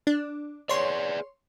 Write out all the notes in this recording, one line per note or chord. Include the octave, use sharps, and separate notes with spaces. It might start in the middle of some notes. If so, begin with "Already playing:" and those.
D4
G#4 B4 C#5 D5 C6